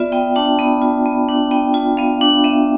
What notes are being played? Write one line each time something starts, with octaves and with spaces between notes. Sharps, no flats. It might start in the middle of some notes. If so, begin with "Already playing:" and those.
Already playing: B3 F4 D5 E5
B3 G5
D4 A5
B3 B5
F4
B3
D4
B3 G5
F4
B3 F5
D4
B3 E5